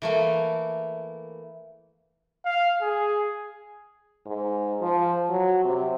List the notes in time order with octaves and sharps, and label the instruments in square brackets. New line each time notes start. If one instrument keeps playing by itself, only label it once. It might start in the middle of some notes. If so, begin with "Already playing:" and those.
[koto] E3 A3 A#3
[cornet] F5
G#4
[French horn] G#2
F3
F#3
C3